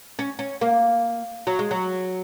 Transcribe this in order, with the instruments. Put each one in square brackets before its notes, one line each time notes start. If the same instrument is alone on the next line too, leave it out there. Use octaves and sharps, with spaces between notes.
[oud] C#4
C#4
A#3
F#3
G#3
F#3